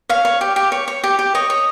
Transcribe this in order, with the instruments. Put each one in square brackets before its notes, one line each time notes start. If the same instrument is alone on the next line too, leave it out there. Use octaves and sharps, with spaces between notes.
[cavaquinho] C#5 F5
C#5
G4
G4
C#5
C#5
G4
G4
C#5 D#5
C#5